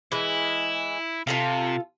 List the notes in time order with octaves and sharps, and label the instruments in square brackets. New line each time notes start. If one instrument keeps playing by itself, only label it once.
[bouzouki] E3 G#3 [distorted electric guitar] E4
[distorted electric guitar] C3 [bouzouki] F4 A4 F5